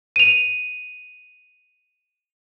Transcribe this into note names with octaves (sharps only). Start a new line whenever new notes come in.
D#7 F7